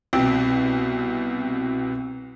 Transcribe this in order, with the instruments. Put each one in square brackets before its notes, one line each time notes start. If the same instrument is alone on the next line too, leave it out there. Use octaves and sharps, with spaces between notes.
[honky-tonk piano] C2 B2 [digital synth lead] C4